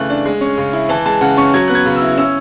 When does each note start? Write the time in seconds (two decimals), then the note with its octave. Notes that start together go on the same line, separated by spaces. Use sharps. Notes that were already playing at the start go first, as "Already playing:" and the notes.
Already playing: C#3 E3 A3 F#6
0.10 D4
0.25 G#3
0.41 C#4
0.58 C#3
0.73 E4
0.89 E3 A5
1.06 G#3 A5
1.21 C#3 F#5
1.37 C#4 C#6
1.54 F#3 G#6
1.68 B3 F#6
1.75 G#6
1.86 C#3
1.96 E6
2.02 E4
2.17 C#4 E6